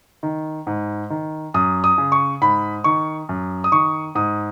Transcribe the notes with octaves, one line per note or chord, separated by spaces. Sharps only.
D#3
G#2
D#3
F#2 D#6
D#6
C#3
C#6
G#2 B5
D#3 C#6
F#2
D#6
D#3 C#6
G#2 D#6